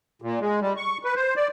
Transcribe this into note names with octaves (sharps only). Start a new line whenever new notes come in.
A#2
G#3
G3
C#6
B4
C5
D5